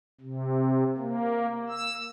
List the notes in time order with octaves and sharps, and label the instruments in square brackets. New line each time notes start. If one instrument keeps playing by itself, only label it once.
[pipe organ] C3
A#3
E6